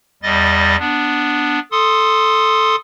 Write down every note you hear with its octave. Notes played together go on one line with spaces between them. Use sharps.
E2 G3 D#5 A6
B3 D4
A4 C6 D#6